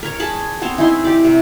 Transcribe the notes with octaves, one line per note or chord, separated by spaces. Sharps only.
A#4 C#5
G#4 A5 B5
B3 C4 C5 C#5
E3 D#4 E4 C6
G4 D5
C3